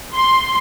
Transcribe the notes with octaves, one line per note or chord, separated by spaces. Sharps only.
C6